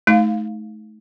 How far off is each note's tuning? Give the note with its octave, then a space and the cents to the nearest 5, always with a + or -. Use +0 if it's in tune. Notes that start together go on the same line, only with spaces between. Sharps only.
A3 -30 D#4 +25 F5 +0